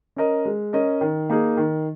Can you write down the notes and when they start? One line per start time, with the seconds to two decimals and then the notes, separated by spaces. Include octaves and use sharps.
0.16 C#4 A#4 D#5
0.45 G#3
0.73 C#4 A#4 D#5
1.01 D#3
1.30 A#3 D#4 G#4
1.57 D#3